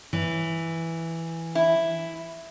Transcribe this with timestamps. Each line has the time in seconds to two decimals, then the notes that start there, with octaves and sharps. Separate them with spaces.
0.13 E3
1.55 E4